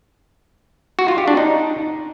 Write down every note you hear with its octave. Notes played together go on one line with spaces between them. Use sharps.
F#4
F4
G4
D4
D#4